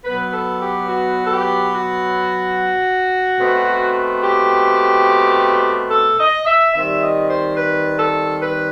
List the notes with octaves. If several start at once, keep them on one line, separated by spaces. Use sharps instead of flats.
B2 F#3 B3 B4
A4
G4
F#4
A4
G4
F#4
B2 A3 C4
G4
A4
D#5
E5
D#3 G3 C4 E5
D#5
C5
B4
A4
B4